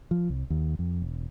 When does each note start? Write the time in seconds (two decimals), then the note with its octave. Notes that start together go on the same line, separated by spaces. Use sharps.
0.11 F3
0.29 C2
0.50 D#2
0.79 F2
1.02 E1